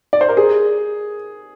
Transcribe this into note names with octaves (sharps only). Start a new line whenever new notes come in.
D5
C5
A#4
G#4